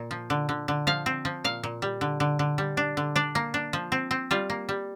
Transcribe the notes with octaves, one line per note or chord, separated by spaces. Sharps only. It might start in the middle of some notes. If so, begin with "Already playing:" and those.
Already playing: A#2
F3
D3
D3
D3
F3 F5
C4
F3
A#2 F5
A#2
G3
D3
D3
D3
G3
D4
D3
D4 D5
A#3
D4
F3
C4
C4
G3 F4
A#3
G3